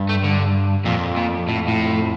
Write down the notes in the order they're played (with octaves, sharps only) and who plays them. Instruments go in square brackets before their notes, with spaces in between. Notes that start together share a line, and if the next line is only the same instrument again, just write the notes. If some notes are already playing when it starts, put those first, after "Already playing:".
Already playing: [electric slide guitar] G2
[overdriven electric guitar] A3
D3
[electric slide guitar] F2 [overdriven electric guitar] A#2
[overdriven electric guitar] A#2
A2
A2